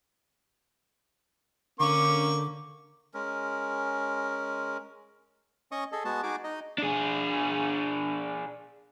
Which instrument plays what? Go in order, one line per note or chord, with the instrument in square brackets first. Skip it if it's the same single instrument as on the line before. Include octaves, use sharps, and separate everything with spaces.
[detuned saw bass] D3 [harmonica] A#3 C#4 C#6 [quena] D6
[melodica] G#3 C#4 A#4
[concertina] C#4 D#5 C#6 D#6
G#4 A4 D#5
G#3 B3 F#4 A5
D#4 F#4 G#4 D6
D#4 D#5
[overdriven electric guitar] D4 G#4